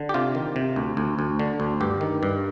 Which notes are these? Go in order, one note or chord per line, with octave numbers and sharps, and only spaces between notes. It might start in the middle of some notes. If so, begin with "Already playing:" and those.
Already playing: D3
G4
C3 F4
D#3
C3
D2
D2
D2
D3
D2
G2 G4
D#3
G2